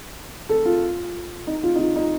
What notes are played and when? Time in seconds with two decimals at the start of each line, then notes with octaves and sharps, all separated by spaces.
0.49 A4
0.65 F4
1.47 D#4
1.63 F4
1.75 D#4
1.79 F4
1.96 D#4